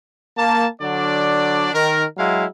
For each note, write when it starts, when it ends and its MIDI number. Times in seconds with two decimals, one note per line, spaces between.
0.37 0.66 58
0.37 0.66 81
0.81 1.70 50
0.81 1.70 54
0.81 1.70 62
0.81 1.70 74
1.73 2.03 51
1.73 2.03 70
2.17 2.44 54
2.17 2.44 56
2.17 2.44 64
2.17 2.44 77